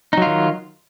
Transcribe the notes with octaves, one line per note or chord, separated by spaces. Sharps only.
D#3 F#3 D#4 F4